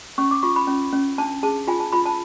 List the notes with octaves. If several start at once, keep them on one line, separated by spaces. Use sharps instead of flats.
C#4 C#6
D6
F4 C#6
B5
C#4
C#4
D4 A5
G#4 A5
F4 G#5
A5
F4 B5
A5